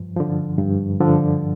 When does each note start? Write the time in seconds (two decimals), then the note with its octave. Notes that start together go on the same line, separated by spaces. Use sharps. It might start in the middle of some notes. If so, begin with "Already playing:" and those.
Already playing: G2 F3
0.16 D3 F3
0.59 G2
1.00 D3 F3